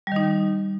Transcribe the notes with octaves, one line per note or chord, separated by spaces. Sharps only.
D#3 G3 D#4